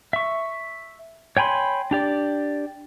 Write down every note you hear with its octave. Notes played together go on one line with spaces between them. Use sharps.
E5 C#6
C#5 G5 G#5 B5 C6
D4 G4 D5